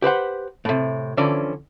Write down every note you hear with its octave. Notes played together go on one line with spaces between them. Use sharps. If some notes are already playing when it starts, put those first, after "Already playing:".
G4 B4 C5 F#5
A2 C3
D3 E3 F3 C#4 D5